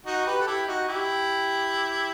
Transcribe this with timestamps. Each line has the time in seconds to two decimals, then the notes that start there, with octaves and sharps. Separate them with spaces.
0.06 D#4 F#4
0.26 G4 B4
0.41 A4
0.47 E4 G4
0.67 D#4 F#4
0.88 E4 G4